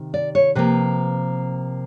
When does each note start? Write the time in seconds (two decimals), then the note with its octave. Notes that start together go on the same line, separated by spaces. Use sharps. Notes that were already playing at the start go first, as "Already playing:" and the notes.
Already playing: C3 D#3
0.14 D5
0.35 C#5
0.55 C3 F3 A#3 B4